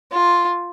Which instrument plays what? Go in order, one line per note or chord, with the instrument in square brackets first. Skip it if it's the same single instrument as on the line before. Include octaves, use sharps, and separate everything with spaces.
[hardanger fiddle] F4